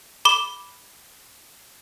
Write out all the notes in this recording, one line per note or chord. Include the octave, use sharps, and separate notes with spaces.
B5 D6 G7